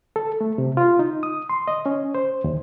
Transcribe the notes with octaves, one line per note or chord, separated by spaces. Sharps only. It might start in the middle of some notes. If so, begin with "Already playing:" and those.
A4
A3
C3
F4
D#4
D#6
C6
D#5
C#4
C5
D#2